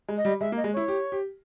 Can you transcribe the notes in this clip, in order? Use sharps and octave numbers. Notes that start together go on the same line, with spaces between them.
G#3
D#5
G3
G#3 E5
A#3
D#5
G#3
E4 C#5
G4
G4